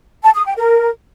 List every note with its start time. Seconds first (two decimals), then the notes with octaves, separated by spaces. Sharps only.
0.24 A5
0.35 D#6
0.46 G5
0.57 A#4